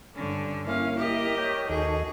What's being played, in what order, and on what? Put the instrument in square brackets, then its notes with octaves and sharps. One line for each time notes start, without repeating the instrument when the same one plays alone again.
[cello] G2 D3 [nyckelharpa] C#4
[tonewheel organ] A#3 E4 [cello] C#4 [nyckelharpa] F5
[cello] G4 [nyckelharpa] A#4 D#5
[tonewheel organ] C#5 G5
[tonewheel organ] D#2 D#4 A4 [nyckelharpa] F#4 [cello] G#4